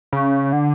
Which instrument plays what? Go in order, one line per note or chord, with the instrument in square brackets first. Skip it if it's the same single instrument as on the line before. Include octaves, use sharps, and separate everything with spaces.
[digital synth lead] C#3
D3